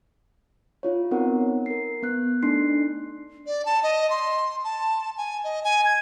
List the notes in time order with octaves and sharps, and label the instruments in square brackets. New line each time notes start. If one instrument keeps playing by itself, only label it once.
[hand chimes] E4 F4 C#5
B3 C4 D#4 F#4 A#4 F#5
A#4 C7
B3 F#6
A3 D4 D#4 C6 C7
[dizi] D5
A5
D#5
C6
A5
G#5
D#5
G#5
G#6